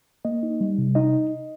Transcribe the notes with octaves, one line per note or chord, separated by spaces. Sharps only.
A#3 D#5
D#4
G3
C3
D#4 D#5